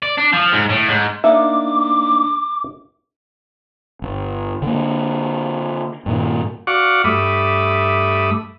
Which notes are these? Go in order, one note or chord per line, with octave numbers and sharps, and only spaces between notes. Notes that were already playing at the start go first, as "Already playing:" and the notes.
D5
D4
F3
G#2
A2
G#2
A#3 D4 D#4 E5 D6
G1
D3 A#3
G2 A#2 D#3
F#4 D5 F5 F#5 C#6 D6
G2 A3 E5 B5 D6 D#6